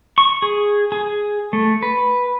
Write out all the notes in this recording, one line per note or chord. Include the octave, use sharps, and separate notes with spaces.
C#6
G#4
G#4
A3
B4